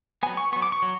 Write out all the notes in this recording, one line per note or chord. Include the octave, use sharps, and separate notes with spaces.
F#3 B3 G#5
C#6
F#3 B3 C#6
D6
C#6
F#3